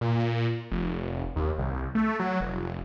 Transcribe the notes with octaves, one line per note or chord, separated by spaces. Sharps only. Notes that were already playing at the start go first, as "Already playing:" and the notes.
A#2
F1
D#2
C2
A3
F#3
F1